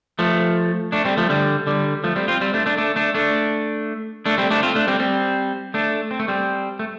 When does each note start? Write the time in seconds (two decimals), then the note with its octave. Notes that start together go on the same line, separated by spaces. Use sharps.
0.19 F3 A3
0.92 A3 D4
1.05 G3 C4
1.18 F3 A3
1.29 D3 G3
1.67 D3 G3
2.04 F3 A3
2.16 G3 C4
2.28 C4 F4
2.41 G3 C4
2.54 A3 D4
2.66 A3 D4
2.78 A3 D4
2.96 A3 D4
3.14 A3 D4
4.26 A3 D4
4.38 G3 C4
4.51 A3 D4
4.63 C4 F4
4.75 A3 D4
4.88 G3 C4
5.00 G3 C4
5.74 A3 D4
6.11 C4
6.19 A3
6.28 G3 C4
6.79 A3